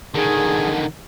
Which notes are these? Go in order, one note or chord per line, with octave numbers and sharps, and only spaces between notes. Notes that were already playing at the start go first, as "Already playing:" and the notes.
D3 D#3 G#4